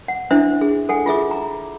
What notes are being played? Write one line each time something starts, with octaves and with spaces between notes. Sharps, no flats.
F#5
D4 E4 C5 E5
G#4
A4 F#5 G#5
F4 G#4 E5 D6
A#5